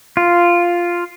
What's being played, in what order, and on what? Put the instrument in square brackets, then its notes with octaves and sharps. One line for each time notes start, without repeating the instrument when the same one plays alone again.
[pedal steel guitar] F4